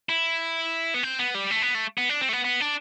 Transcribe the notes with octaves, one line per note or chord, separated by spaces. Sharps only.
E4
B3
C4
B3
G3
A3
B3
A3
B3
D4
C4
A3
B3
B3
D4